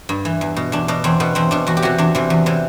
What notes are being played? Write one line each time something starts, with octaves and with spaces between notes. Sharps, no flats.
G2
E3
E2
B2
E2 D4
B2 D4
E2 C4
B2 B3
E2 C4
B2 D4
E2 F#4
G4
C3 E3 F#4
E2 D4
C3 E3
E2
C3 E3